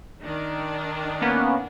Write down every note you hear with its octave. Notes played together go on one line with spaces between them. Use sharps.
D#3 D4
A#3 B3 C#4